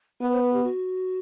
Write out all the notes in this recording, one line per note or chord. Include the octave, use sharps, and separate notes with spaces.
B3 B4
C5
B4
G4
F#4